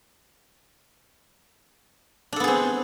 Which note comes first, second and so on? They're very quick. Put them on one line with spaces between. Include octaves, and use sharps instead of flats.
D4 A4 B3 G#4 C4